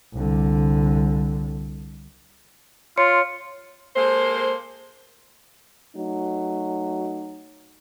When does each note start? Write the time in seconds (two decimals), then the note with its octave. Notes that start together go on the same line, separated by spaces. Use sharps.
0.14 C2 D3
2.98 F4 C#5 C6 C#7
3.96 G#3 A#3 A4 C5
5.96 F#3 A3 D#4